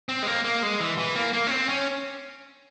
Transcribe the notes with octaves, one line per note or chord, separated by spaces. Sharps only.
C4
G#3
A#3
A#3
G#3
E3
E3
A#3
A#3
C#4
C4
C#4